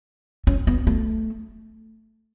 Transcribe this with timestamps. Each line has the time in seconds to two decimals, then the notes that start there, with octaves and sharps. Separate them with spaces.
0.47 C#4
0.67 B3
0.87 A3